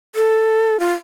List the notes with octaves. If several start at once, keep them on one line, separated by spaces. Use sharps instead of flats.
A4
F4